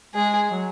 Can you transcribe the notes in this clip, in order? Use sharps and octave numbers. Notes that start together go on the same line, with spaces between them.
G#3 G#4
F#3